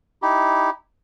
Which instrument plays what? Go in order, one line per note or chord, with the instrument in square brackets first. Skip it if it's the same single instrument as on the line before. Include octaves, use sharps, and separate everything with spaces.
[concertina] D#4 E4 G4